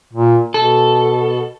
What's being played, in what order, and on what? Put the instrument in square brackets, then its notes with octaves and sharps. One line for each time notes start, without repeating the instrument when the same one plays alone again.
[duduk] A#2
[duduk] B2 [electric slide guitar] A4